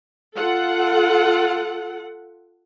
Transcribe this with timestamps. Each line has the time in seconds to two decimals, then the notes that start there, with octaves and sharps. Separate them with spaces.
0.35 F4 A4 F#5